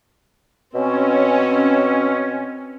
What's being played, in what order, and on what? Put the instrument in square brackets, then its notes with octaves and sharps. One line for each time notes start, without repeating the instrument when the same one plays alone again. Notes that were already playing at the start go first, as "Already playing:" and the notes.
[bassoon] B2 [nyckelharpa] C4 [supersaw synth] C#4